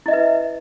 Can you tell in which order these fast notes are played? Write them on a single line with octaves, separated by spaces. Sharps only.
E4 D#5 E5 B4